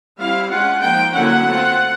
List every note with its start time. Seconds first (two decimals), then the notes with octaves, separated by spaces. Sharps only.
0.19 G3 C4 E4 F5
0.51 G#3 C#4 F4 F#5
0.83 F3 A#3 D#4 G5
1.14 D3 F#3 A#3 C#4 E4 F#5
1.47 A3 C4 F4